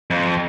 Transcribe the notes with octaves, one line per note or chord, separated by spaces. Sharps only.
F2